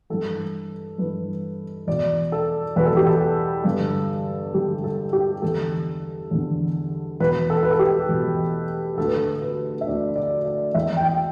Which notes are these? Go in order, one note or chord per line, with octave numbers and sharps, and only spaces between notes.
G2 E3 A4
G2 E3 B4
E2 B2 D5
A4
E2 B2 B4
A4
G4
A4
G2 D3
G2 D3 G4
A4
G4
E2 D3 A4
E2 D3
E2 B2 B4
A4
B4
A4
G4
E2 B2
D2 D3 A4
B4
A4
B4
E5
D2 D3 D5
D5
D5
E2 E3 E5
G5
G5